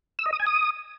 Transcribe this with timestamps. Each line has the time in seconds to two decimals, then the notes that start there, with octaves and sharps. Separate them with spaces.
0.19 E6
0.26 D#5
0.33 D#6
0.40 G#5
0.46 D#6